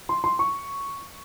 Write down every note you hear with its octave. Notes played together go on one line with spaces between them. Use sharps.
C6
C6
C#6